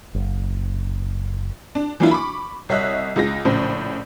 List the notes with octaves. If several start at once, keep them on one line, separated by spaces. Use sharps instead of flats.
F#1
D4
E3 F#3 A#3 D4 E4 F4
B5 C#6 D6
C2 C#5 D#5 E5 F#6
C#2 G#3 F4 A#6
A#1 A2 C#3 C5